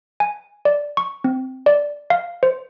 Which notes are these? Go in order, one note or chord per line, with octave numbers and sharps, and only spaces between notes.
G#5
D5
C#6
C4
D5
F5
C5